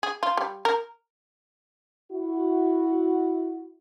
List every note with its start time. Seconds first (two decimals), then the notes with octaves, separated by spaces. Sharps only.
0.03 G#4
0.23 F4
0.37 G3
0.65 A#4
2.12 E4 F#4